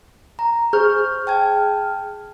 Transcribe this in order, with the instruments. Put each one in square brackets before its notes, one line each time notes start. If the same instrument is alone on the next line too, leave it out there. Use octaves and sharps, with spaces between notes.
[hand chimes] A#5
[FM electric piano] G#4 F6 [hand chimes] C5 C#6 G6
[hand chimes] G5 A5 G#6